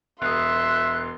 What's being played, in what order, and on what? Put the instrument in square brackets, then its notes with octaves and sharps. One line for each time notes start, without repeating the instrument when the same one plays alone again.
[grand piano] E1 D#6 [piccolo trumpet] E5 [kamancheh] C6 [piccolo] F#6